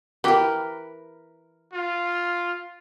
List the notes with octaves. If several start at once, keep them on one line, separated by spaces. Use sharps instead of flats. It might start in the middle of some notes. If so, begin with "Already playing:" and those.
E3 G4 A#4 B4
F4